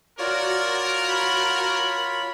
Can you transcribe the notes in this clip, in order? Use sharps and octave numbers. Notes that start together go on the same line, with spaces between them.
F4 F#4 A#4 C#5 D5
B5